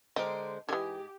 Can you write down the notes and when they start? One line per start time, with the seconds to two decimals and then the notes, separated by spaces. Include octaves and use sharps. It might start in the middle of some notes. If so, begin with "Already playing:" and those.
0.16 D3 G#3 G4 A#4 C5 D#5
0.69 G#2 D3 E3 G4 D#5 G#5